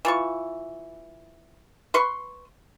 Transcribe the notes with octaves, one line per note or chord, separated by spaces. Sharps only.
E3 F4 C#6
B4 C6 C#6